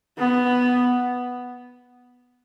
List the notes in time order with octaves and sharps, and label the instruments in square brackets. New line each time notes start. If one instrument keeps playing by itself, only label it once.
[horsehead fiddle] B3